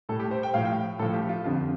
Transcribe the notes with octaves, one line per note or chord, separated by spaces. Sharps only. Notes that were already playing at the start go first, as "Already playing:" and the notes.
A2 G3 A4
G4
C5
G5
A2 F3 F5
G5
A2 F3 A4
G4
F4
F2 D3 F3 F4